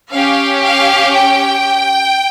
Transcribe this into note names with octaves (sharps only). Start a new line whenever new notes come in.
C#4 G4 F5
F5
G5